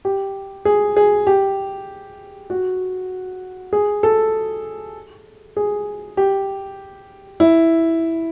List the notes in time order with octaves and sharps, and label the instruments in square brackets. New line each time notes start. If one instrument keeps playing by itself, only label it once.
[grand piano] G4
G#4
G#4
G4
F#4
G#4
A4
G#4
G4
E4